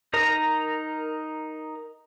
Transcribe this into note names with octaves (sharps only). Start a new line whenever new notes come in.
D#4 A#4 A#5